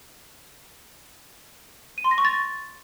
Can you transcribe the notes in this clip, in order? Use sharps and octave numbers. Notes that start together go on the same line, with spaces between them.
D#7
C6
A#6
C#6
A6